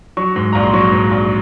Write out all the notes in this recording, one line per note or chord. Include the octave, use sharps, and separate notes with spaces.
F#3 C#6
G#2
A#1 A#5
C6
F#3 C#6
G#2
A#1